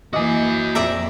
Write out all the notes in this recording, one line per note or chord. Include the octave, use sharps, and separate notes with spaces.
E3 A#3 F#4 D#5 G#5 D6 D#6
F2 A#2 D5 E5 A#5